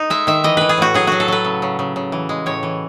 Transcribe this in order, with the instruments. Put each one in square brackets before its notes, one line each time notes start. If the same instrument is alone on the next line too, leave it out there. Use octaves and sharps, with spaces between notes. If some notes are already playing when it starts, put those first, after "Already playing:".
Already playing: [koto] D#4
G#3 E5
D#3 E5
E3 D#5
E3 B4
G#4
A2 F#4
F#3 G#4
F#3 F#4
A4
F#3 B4
C#3
C#3
C#3
C#3
E3
G#3
A2 C#5
E3